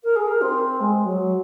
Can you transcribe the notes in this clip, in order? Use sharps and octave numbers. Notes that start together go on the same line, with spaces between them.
A#4
G#4
A#4
C4
G#3
F#3